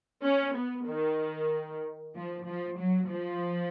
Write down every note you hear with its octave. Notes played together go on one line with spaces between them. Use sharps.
C#4
B3
D#3
F3
F3
F#3
F3